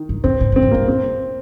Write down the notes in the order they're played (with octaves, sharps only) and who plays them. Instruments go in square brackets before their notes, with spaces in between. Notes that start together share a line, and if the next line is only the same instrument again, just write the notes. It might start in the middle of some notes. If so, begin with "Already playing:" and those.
Already playing: [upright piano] D#3
[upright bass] G2
[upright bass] F2 [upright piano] C4
[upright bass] G#2
[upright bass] G2 [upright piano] C4
[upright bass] F2
[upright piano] A#3
[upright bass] G2
[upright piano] C4